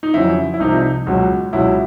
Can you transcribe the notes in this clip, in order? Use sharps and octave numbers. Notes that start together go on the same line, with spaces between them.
D#4
F2 C#3 F#3 E4
E4
C2 C3 F3 D#4
C#2 B2 F#3
C#2 B2 F#3 E4